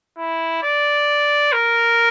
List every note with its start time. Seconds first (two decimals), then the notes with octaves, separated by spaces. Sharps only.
0.18 E4
0.63 D5
1.52 A#4